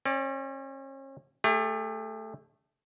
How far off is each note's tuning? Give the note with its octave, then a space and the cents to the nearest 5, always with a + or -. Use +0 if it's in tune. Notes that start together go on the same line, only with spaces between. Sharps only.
C#4 -40 D5 +0
A3 +0 G4 +45